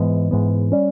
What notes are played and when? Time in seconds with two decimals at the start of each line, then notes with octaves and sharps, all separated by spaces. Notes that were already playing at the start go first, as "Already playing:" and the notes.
Already playing: G#2 E3 G#3 B3
0.31 G#2 E3 G#3 B3
0.72 G3 C#4